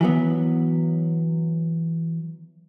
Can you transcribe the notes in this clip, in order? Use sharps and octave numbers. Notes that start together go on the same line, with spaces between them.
E3 F#3 B3